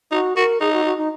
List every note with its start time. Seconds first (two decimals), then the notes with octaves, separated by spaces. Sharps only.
0.12 D#4 F#4
0.36 F#4 A#4
0.61 D#4 G#4
0.73 F#4
0.85 F#4
0.98 D#4